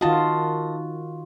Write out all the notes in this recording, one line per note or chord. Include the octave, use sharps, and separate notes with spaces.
D#3 F4 F#4 D#5 A5